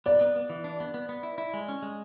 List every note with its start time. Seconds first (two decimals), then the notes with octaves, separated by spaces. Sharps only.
0.06 B3 D5
0.21 B3
0.36 B3
0.50 E3
0.64 D4
0.80 B3
0.94 B3
1.09 B3
1.23 E4
1.38 E4
1.54 G#3
1.68 C#4
1.82 G#3